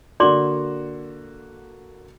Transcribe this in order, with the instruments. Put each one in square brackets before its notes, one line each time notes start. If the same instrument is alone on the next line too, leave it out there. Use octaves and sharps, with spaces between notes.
[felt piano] D3 A#3 F#4 [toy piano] D5 C6 D6